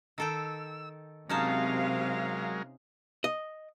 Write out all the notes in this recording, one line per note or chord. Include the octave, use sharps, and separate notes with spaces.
D#3 A4 G5 E6
C3 F#3 G#3 C#4 D#4 A#4 F5 A5
D#5